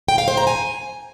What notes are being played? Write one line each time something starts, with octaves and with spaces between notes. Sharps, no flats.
G5
F5
C5
A#5
G#5